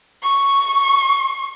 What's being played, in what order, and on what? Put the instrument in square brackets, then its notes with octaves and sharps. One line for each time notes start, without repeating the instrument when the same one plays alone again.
[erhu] C#6